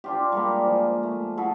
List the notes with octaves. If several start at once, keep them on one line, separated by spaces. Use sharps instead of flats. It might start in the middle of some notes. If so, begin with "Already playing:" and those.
D4 F4 G4
G3 G#3 A#3
F3
A3
F#4 G#4 A4 B5